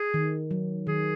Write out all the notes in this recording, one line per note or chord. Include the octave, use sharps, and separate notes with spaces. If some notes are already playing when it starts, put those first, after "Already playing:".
Already playing: G#4
D#3
F#3
D#3 G#4